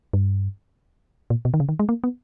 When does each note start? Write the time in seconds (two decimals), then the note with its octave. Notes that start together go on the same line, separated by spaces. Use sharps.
0.13 G2
1.30 A#2
1.45 B2
1.54 D#3
1.60 C#3
1.69 D#3
1.79 G#3
1.89 A#3
2.04 B3